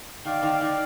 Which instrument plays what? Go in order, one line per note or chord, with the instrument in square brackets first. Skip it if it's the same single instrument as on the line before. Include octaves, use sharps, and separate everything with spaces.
[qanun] D#3 [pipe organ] D5 F5
[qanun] D#3
D#3